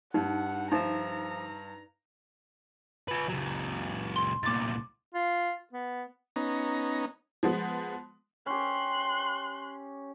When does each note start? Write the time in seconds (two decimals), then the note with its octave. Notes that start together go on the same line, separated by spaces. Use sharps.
0.14 G2 D#4 F#5
0.72 F3 D#4 E5 A#5
3.08 F4 B4
3.29 C#2 F#3
4.16 C6
4.43 C2 A#2 D6 A6
5.14 F4
5.73 B3
6.36 B3 C#4 D#4 A#5
7.43 F3 G#3 B3
8.46 C#4 G4 C6 F#6